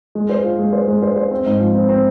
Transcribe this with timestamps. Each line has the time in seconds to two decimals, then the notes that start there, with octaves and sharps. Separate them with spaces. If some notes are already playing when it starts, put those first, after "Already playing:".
0.15 G#3
0.29 C5
0.44 F4
0.59 G#3
0.73 C5
0.88 G#3
1.02 C5
1.16 C5
1.31 C4
1.46 G#2
1.60 F3
1.75 C4
1.89 C4